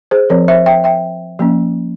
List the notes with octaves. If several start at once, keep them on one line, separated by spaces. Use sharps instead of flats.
G#4 C5
F3 C4 A#4 C#5
C5 E5
E5 G5
E5 G5
F3 A#3 C#4